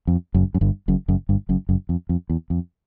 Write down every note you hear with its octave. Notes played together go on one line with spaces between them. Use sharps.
F2
F#1 F#2
F#2
G1 G2
F#1 F#2
F#1 F#2
G1 G2
F#1 F#2
F#1 F#2
F2
F2
E2
F2